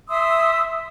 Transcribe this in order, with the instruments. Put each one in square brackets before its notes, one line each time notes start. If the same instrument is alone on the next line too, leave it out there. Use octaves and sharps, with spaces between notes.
[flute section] E5 C6 D#6 E6